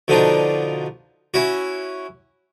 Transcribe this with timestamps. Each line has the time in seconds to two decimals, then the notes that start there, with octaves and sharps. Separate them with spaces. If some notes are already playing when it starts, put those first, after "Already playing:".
0.08 B2 D3 F3 D4 D#4
1.34 C#4 E4 F#4